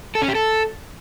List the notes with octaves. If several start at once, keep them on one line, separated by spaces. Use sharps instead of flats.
A4
C#4
G4
A4